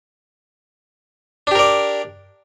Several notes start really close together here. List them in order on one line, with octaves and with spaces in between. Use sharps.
D4 G4 A#4 D5